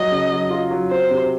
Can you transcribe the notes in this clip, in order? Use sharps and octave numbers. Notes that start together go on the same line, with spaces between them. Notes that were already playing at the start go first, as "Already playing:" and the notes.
Already playing: F#3 D#5
C#3
F#3
F4
F#3
C4 C5
C3